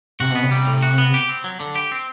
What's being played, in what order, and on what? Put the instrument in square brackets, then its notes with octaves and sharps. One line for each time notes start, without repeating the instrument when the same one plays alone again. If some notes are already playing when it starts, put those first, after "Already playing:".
[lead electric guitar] C3 [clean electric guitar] F#4
[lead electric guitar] B2 [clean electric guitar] B3
[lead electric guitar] C3
[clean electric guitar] G3
A2
F#4
B3
G4
C4
F#3
D3
G4
C4